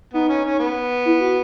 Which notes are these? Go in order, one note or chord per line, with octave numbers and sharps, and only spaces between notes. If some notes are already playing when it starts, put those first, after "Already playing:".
B3 D#4
C#4
C#4
B3
E4
F#4